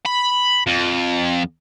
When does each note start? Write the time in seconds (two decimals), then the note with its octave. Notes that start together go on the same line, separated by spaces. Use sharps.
0.06 B5
0.67 F2